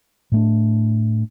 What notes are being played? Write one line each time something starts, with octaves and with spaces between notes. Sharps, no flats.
A2 A3 D4